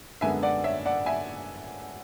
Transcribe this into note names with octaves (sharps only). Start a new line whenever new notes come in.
F#2 D3 G#3 B3 E5 G#5
D5 F#5
C#5 E5
D5 F#5
E5 G#5